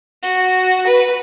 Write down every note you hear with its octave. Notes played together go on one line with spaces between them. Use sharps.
F#4
B4